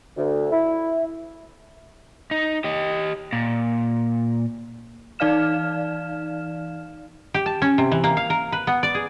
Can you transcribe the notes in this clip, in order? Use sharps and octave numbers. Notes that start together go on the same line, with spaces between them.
D2
E4
D#4
G4 D#5
A#2
E3 D#4 D5 F5 F6 E7
G4
A5
C#4
C3
E3
A#3
F5
A#4
B4
B3
D5
G#4